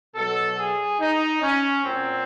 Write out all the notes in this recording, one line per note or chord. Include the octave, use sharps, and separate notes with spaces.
B2 F#3 A4
G#4
D#4
C#4
A#2 F#3 C4